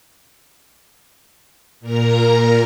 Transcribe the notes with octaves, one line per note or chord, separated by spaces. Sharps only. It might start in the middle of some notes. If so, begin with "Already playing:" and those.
A#2 A#4 A#5